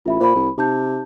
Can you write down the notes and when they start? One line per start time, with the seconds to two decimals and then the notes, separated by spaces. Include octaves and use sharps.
0.06 A1 F4 E5 B5
0.20 A#2 C5 B5
0.36 C2
0.58 C3 D#4 A5 G6